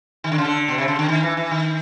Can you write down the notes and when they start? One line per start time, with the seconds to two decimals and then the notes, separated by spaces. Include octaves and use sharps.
0.24 D#3
0.32 D3
0.38 C#3
0.45 D3
0.68 B2
0.78 C3
0.88 C#3
0.99 D3
1.08 D#3
1.23 E3
1.37 E3
1.51 D#3